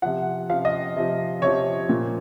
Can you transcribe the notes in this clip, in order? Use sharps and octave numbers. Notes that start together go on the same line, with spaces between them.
C3 F3 F#5
C3 F3 F5
D#5
C3 F3
C3 F3 C#5
A#2 F3